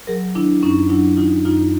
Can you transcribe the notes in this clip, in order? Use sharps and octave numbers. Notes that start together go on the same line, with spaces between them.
F#3 G#4 A#4
D#3 D4 E4
F#2 C#4 D#4
F#3 D4 E4
D#3 D#4 F4
F#2 D#4 F4